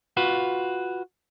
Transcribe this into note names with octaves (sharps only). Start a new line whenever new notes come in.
F4 F#4 B4